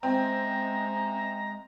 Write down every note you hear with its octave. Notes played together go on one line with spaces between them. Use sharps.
G#3 C4 E5 A#5